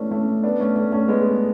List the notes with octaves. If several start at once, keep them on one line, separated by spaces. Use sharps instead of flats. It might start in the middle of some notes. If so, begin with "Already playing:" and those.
Already playing: E3 G#3 A3 B3 C#4 D4
A3 C#4
B3 D4
A3 C#4
A3 C#4
A3 C#4
G#3 B3